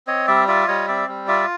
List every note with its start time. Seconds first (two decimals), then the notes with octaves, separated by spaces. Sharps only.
0.07 C4 C#5 D#5
0.27 G3 D5 E5
0.48 F4 D5 E5
0.68 G3 C#5 D#5
0.88 C4 D5 E5
1.08 G3
1.28 F4 D5 E5